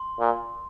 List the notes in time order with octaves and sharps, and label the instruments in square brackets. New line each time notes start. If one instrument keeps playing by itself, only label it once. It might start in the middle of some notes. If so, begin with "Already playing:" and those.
Already playing: [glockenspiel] C6
[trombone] A#2